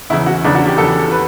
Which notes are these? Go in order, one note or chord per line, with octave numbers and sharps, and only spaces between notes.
E2 C#3 E3 E4
F#4
E2 C#3 E3 D4
F#4
G4
E2 C#3 E3 A4
B4